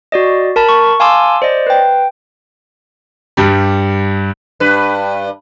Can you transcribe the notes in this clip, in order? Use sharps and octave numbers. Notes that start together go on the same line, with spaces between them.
F#4 D5 D#5
A#4 A5 B5
C#6
F5 G#5 A5 C6 D6 E6
C5 D5 D#5
B4 G5
G2 G3
G2 B4